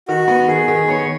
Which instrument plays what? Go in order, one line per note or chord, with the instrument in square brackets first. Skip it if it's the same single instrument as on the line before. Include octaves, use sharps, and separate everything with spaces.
[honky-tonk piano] D#3 [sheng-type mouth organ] F#4
[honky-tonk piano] B3
[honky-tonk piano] D#3 [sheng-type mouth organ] G#4
[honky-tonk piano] D#3
[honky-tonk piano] B3 [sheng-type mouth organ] C#5